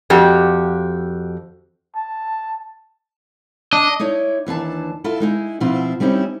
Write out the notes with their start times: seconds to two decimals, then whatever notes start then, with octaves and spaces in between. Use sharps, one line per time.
0.10 F2 F#4 G4
1.96 A5
3.73 D4 D#5
4.00 D#4 E4 C#5 D5
4.47 D#2 E3 D4 A5
5.04 E4 F4 A4
5.20 G#3 D#4 E4
5.60 B2 F3 C4 E4 F4
6.00 G3 C4 C#4 D#4 E4